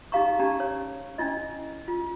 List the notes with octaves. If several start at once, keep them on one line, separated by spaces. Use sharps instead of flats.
D#4 G4 G#4 F5 A#5 C#6
C#4 D4 G4 A5 A#5
C#5
C#4 D4 E4 D#5
F4